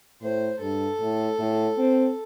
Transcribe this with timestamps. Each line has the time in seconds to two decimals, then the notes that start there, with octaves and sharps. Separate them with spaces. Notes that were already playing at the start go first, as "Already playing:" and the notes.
0.21 A2 C5
0.60 G2 A4
0.99 A2
1.39 A2
1.77 C4